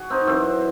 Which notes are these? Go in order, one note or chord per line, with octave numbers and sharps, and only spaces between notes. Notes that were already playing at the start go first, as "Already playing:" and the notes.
Already playing: F#4 G#4
C4 D#4
F#2 E3 C4